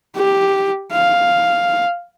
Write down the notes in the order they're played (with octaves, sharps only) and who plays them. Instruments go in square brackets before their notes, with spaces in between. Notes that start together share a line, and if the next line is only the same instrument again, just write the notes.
[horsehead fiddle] G4
F5